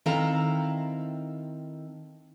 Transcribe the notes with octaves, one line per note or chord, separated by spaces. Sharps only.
D#3 C4 E4 A4 F5 A#5